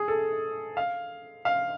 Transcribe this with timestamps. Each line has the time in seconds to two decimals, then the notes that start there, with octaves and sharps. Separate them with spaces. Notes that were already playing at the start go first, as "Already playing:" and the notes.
Already playing: G#4
0.08 A4
0.77 F5
1.45 F5